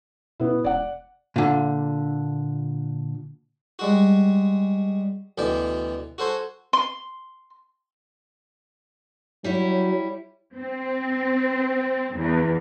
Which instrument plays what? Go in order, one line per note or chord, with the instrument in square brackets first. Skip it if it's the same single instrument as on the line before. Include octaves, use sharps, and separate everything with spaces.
[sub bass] B2 [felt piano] B3 E4
[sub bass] E1 [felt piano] D5 F#5
[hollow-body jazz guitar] A#2 D3
[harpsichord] G3 G#3 F#4
D2 B2 E3 D5 G5
F#4 A4 C5 G#5
[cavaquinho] C6
[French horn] F#3 [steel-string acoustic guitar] G3 E4 C#5
[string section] C4
E2